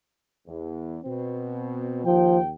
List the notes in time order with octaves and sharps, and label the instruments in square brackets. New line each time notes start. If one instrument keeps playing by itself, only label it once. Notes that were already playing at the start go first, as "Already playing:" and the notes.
[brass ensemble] E2
B2 C4
[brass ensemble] D#2 G5 [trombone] F3